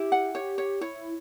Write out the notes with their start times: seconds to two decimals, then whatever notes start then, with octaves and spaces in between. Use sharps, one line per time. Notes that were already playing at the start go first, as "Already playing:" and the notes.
Already playing: E4 G4
0.12 F#5
0.34 G4 C#5
0.58 C#5
0.81 E4 C#5